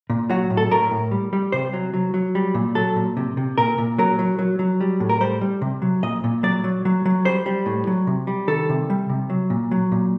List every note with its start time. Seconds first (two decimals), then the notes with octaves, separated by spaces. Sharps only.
0.10 A#2
0.30 F#3 F#4
0.50 A2
0.57 A4
0.71 A2 A#4
0.91 A2
1.11 G3
1.33 G3
1.52 C3 C5
1.73 F#3
1.94 F#3
2.14 F#3
2.35 G3
2.55 A#2
2.75 F#3 A4
2.96 A#2
3.17 C3
3.37 C3
3.58 A#2 A#4
3.78 A#2
3.99 F#3 A#4
4.19 F#3
4.39 F#3
4.59 F#3
4.81 G3
5.00 A2
5.09 A#4
5.21 G3 C5
5.41 G3
5.62 C3
5.82 F#3
6.03 A#2 D#5
6.24 A#2
6.43 F#3 D5
6.64 F#3
6.85 F#3
7.05 F#3
7.25 G3 C5
7.46 G3
7.66 A2
7.87 F#3
8.07 C3
8.27 G3
8.48 D#3 A4
8.69 C3
8.90 G3
9.09 C3
9.30 F#3
9.50 A#2
9.71 F#3
9.92 A#2